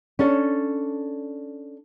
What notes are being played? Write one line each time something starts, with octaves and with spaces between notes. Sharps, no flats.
C#4 D4 A4